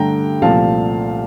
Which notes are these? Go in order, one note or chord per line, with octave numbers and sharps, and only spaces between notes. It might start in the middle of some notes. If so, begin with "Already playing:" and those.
Already playing: G2 D3 A3 G5 A#5
C2 A#2 F3 A3 F5 A5